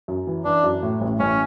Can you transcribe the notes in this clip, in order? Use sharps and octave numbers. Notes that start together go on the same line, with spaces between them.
F#2
E3
E3 D4
F#2
A2
A1
A1 C#4